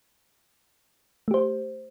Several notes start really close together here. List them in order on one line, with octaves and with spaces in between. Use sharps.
A3 G4 C5